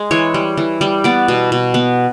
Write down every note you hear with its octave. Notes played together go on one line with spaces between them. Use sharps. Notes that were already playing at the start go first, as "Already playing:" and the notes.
Already playing: G#3
E3 C#5
G3
E3
G3
B3 D5
B2
B2
B3